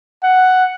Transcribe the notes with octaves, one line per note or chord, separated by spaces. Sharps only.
F#5